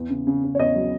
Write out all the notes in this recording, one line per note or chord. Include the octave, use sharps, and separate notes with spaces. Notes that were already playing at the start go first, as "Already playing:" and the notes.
Already playing: E2
C#3
C#3
C#3
C#5
E2 D#5
F#3